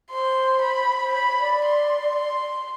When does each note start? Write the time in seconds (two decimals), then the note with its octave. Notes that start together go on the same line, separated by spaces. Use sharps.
0.10 C5 C6
0.62 B5
1.02 C5
1.13 C#5 B5
1.39 D5
1.65 C6
2.17 C6